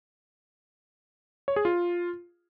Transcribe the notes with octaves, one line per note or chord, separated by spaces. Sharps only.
C#5
G#4
F4